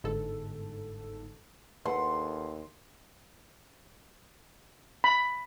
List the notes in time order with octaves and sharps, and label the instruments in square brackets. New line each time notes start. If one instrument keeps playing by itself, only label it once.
[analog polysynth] G1 G#2 A4
[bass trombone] D#2 [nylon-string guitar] A4 B4 F#5 [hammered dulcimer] C6
[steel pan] B5